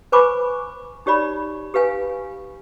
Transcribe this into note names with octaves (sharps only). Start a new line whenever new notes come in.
B4 C5 G#5 B5 C#6 D6
D#4 G4 C#5 D5 B5
G4 B4 F5 G#5